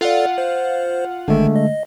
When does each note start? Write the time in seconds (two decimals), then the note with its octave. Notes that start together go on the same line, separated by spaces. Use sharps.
0.01 F4 A4 D5 F5 F#5
0.38 C5
1.28 G#1 D3 D#3 G#3 A3
1.56 D#5